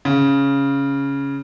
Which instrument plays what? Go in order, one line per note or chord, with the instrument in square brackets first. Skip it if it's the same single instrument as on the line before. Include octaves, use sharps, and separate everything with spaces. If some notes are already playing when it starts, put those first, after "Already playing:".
[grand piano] C#3